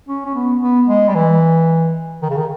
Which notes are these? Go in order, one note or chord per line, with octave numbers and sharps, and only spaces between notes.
C#4
C#4
B3
B3
G#3
G3
E3
D#3
C#3
D#3